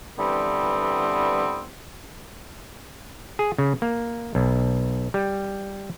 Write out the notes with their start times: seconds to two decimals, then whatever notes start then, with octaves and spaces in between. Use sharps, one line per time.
0.18 D3 E3 G3 B3 C4
3.39 G#4
3.58 C#3
3.82 A#3
4.35 B1
5.14 G3